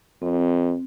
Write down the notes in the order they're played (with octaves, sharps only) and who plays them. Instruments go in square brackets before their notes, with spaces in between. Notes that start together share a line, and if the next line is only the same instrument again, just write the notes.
[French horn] F2 [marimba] C4